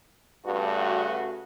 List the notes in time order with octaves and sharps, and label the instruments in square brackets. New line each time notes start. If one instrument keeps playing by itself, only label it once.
[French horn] G2 [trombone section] C#3 A3 F#4